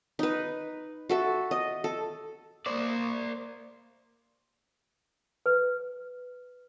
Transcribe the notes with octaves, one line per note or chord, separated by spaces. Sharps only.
D#4 B4
F#4 A4 E5
D#5
A4
A#3 C5 D5
B4